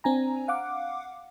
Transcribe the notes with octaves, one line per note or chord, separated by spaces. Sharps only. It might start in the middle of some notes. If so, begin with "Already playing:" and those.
C4 D4 G#5 A#5
F5 F#5 D6